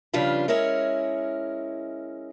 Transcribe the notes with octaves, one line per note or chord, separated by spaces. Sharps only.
C#3 F3 G3 D4 F4 B4
G#3 C#4 E4 A#4 C#5